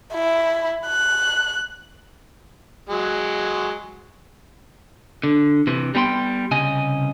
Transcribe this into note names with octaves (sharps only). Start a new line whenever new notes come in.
E4
F#6
F#3 G#3
D3
C3 E3
G3 B3 G5 B5 C6
C2 C#3 D#5 G#5